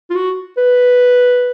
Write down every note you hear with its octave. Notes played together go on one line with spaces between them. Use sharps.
F4
F#4
B4